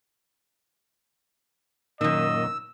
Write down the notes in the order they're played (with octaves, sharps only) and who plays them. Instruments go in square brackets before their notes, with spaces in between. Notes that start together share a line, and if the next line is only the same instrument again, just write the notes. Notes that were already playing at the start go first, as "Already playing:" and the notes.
[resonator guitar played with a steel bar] F#2 D#3 [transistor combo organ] A#2 [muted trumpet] D#5 [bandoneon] E6